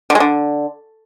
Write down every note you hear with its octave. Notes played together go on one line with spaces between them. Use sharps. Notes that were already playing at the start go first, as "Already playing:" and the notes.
D3
G#3
D3